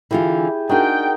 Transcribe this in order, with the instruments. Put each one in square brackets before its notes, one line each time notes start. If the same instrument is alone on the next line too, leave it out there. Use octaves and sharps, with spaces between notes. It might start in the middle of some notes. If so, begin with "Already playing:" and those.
[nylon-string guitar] D3 E3 F4 [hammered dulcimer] E4 G4 G#4
[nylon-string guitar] D4 G#4 [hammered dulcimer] D#4 F#4 A#4 [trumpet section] G5